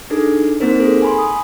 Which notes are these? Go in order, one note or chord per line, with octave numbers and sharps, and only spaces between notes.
D4 D#4 G#4 A4
A#3 C4 D#4 A#4 C5
G#4 A4
G#5 B5 C6
D#6